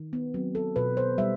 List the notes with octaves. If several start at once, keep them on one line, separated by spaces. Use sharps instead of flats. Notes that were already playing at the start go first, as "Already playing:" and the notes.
Already playing: D#3
B3
F#3 C4
A4
B2 B4
C5
G3 E5